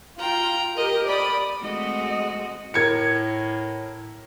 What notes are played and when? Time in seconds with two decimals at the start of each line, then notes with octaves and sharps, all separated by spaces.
0.18 F4 G5 A#5
0.76 G4 A#4 D#5
1.08 D5 B5 D#6
1.61 G#3 A3 C4 F#4 D#5
2.74 A2 A#4 G#6 C#7